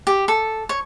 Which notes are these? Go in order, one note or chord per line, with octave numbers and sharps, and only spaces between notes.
G4
A4
C#5